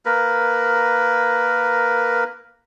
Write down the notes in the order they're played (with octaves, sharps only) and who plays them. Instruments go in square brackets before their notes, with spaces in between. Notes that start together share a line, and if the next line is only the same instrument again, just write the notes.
[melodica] A#3 A#4 B4